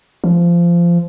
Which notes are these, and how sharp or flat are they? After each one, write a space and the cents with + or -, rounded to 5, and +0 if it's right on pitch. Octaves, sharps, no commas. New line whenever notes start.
F3 -20